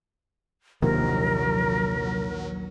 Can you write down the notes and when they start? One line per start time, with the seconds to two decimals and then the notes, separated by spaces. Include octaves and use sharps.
0.82 A#1 D#2 C3 D#3 F#3 A#4